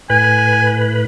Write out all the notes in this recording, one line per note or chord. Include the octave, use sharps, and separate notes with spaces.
A2 B4 G#5